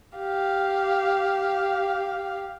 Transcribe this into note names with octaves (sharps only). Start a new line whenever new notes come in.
G4 F5